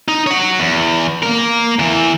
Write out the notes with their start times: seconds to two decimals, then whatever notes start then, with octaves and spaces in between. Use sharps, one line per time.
0.08 D#4
0.27 C#5 F#5
0.59 E2
1.23 A#3 A#4
1.79 E2 E3